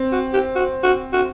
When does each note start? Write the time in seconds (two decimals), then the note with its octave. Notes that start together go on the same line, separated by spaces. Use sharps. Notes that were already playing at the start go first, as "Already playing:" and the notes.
Already playing: C4
0.12 F#4
0.33 G4
0.55 F#4
0.83 F#4
1.13 F#4